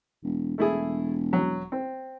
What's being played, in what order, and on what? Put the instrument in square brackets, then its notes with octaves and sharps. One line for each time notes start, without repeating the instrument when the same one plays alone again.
[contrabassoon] E1
[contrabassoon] E1 [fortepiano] A3 E4 G#4
[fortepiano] F#3
C4